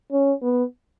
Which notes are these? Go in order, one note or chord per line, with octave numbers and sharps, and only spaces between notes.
C#4
B3